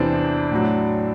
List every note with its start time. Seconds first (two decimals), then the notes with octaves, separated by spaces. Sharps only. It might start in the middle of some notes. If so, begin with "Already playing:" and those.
Already playing: E2 C3 E3 C4 D4
0.52 A2 F#3